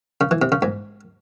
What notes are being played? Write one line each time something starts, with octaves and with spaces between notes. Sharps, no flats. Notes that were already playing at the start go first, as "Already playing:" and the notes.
C#3
E3
C3
C#3
G#2